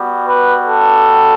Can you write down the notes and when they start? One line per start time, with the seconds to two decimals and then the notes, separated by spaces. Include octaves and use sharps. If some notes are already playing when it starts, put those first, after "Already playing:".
Already playing: G3 B3 F#4
0.26 B4
0.65 A4